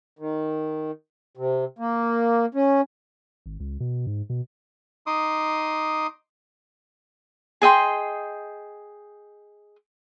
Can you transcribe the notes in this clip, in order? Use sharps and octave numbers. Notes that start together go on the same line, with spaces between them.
D#3
C3
A#3
C#4
G#1
C#2
B2
G#2
B2
D#4 C6 D6 D#6
G#4 D#5 G5 C6